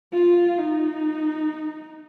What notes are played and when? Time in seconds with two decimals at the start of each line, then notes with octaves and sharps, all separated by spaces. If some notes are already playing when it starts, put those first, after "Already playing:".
0.13 F4
0.58 D#4